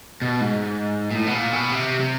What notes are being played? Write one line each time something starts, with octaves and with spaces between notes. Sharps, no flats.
B2
G#2
A#2
A2
B2
A#2
B2
C3
C3